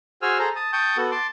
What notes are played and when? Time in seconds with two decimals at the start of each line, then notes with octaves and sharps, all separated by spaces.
0.22 F#4 G#4 C5 G#5 E6 F6
0.39 G#4 A4 C5 A#5
0.56 A5 D#6
0.73 G5 A5 C#6 D#6 G6
0.97 B3 F#4 A4
1.11 A5 C6 D6